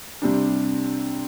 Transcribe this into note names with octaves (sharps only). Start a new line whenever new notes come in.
C3 G3 D4